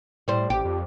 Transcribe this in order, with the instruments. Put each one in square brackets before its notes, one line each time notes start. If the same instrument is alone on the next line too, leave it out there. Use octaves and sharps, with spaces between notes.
[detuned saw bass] A2 [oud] G3 C5
[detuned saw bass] A1 [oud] G4
[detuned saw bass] F2